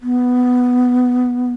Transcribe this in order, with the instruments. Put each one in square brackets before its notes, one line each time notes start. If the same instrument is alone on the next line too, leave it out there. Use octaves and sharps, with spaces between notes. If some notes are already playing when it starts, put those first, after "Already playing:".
[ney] B3